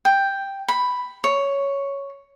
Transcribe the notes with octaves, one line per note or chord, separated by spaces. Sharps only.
G5
B5
C#5